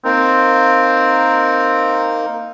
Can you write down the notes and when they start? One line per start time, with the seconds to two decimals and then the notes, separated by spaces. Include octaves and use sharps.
0.05 A#3 C4 D#4 A#4